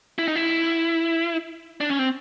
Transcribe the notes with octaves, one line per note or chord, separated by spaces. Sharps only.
E4
D#4
E4
D4
C#4
C4